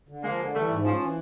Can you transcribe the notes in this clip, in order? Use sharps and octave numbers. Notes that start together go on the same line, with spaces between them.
D3
F3 G#3 A#3
D3
E3 G3 A3
G#2
F3 C#4
E3